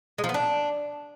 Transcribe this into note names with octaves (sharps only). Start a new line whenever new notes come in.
G#3
F3
B3
D4